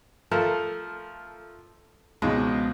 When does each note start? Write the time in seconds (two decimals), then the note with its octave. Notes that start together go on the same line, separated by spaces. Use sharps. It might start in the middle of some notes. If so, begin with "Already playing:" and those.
0.31 F3 A3 A4 A#4
2.22 C#2 B2 F3 G#3